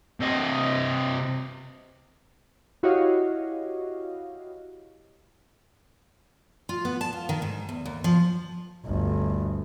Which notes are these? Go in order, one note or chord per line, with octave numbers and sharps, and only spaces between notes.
C3 D#5
E4 F#4 G4 C#5 D#5 F5
F4
B3
A5
F4
D#3
G#2
E2
D#2
F3
G1 D2